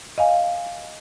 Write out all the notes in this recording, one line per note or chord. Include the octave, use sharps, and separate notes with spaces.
D#5 F5 G#5